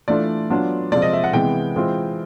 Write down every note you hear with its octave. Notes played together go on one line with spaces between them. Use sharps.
E3 A3 D4 F4 D5
F#3 B3 D4 F4
C3 F3 G#3 C4 F4 D5
D#5
E5
F#5
C3 E3 G#3 B3 G5
E3 G#3 C4 F4